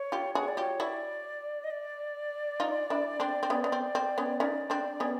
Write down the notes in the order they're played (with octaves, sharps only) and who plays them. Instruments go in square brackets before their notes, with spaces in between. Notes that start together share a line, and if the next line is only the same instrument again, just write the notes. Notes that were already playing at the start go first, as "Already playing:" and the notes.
Already playing: [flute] C#5
[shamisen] F4 G4
[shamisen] F#4 G#4 [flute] C#5
[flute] D5
[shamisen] F4 G4 [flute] C#5
[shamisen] E4 F#4 [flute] D5
[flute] D#5
D5
[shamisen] D#4 F4
D4 E4
C4 D4
C4
B3 C#4
B3
C4
C4
B3 C#4
[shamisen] C#4 D#4 [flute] D5
[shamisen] C4 D4
B3 C#4